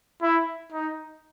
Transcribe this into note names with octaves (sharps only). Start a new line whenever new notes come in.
E4
D#4